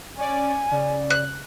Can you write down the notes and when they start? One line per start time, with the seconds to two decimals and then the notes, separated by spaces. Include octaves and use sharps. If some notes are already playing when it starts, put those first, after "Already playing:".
0.17 C#4 D5 G#5
0.71 C#3 D5
1.10 F#6